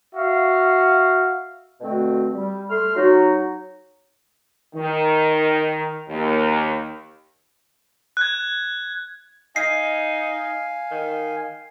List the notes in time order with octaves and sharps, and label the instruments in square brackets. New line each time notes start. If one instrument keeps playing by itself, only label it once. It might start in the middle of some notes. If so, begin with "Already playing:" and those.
[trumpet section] F#4 E5 F5
[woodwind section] B2 D3 A3 C4 F#4
G3
A3 C6 F6
F#3 D#4 F#4
[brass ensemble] D#3
D#2
[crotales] F#6 G#6
[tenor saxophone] D#4 [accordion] F5 G#5 [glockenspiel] C7
[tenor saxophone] D#3